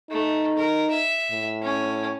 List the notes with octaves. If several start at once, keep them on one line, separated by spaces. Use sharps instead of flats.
A3 D#4
A#4
E5
A2
C#4